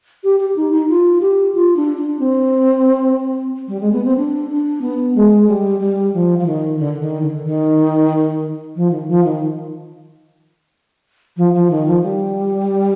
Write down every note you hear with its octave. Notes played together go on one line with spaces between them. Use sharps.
G4
G4
D#4
D#4
F4
G4
F4
D4
D4
C4
G3
G#3
B3
C4
D4
D4
B3
G#3
G3
G3
F3
F3
D#3
D3
D#3
D3
D#3
F3
D#3
F3
D#3
F3
F3
D#3
F3
G3